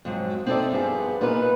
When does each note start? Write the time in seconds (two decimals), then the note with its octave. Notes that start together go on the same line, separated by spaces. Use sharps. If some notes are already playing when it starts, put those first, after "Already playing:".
0.05 F2 G#2 F#3
0.46 C4 D#4 A4 B4 D5 E5
0.72 G2 F3 B3 G#4
1.21 A#2 B3 D#4 A#4 B4